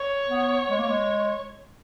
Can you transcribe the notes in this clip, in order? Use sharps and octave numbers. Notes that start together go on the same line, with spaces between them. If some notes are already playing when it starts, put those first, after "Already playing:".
Already playing: C#5
B3
G#3
A#3
G#3